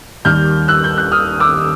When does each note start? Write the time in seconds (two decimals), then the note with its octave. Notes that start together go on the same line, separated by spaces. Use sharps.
0.25 D#2 D#3 G3 F6 G6
0.68 E6 F#6
0.84 G6
0.98 F#6
1.12 D#6 F6
1.40 D6 E6